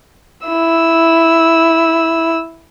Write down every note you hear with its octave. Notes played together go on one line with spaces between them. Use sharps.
E4 E6